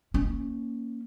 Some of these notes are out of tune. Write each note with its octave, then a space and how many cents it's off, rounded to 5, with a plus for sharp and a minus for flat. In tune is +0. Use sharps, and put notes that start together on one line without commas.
A#3 +0 C#4 +0